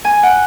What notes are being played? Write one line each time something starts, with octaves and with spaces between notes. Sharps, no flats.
G#5
F#5